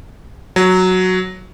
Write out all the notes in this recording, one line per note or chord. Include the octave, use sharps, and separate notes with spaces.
F#3